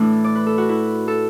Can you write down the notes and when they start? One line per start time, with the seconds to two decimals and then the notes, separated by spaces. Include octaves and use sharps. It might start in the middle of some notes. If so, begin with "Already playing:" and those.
Already playing: A2 E3 A3 D4
0.24 D5
0.35 B4
0.46 A4
0.58 F#4
0.69 E4
1.08 A4